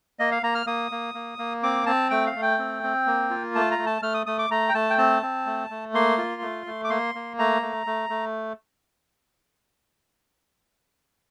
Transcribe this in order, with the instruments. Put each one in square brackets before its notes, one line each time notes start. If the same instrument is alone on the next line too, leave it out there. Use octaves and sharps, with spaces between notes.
[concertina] A#3 D#5
F5
A#3 A#5
F6
A#3 D#6
A#3
A#3
A#3
C4 D6
C4 A5
A3 G5
F5
A3
G5
C4
C4
A#3
F4
A3 A5
A#5
A3
A5
A3 F6
D#6
A3 D#6
D6
A3 A#5
G5
A3 A5
G5
C4 A5
C4
A3
A3
A#3 C6
F4
A3
A3
D6
A#3 C6
A#3
A3 A#5
A3
A3
A3